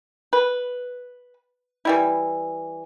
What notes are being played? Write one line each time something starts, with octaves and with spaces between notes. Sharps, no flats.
B4
E3 G3 E4